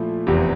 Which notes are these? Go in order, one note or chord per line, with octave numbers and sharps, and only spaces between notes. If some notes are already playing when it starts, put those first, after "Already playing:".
Already playing: A#2 F3 A3 E4
F1 E2 C3